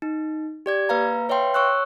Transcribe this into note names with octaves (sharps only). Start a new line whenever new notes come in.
D#4
G4 D5 G#6
A#3 B4 F5 A#5
B4 C#5 E5 F5 G5 C6
C#5 C#6 E6 F#6